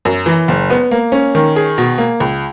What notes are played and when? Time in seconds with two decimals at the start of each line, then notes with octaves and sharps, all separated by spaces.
0.05 F#2
0.26 E3
0.48 F#1
0.70 B3
0.91 A#3
1.12 C#4
1.35 D#3
1.56 G#4
1.78 B2
1.98 A#3
2.20 C#2